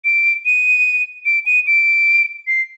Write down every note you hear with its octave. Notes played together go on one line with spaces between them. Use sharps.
D7
D#7
D7
D#7
D7
C7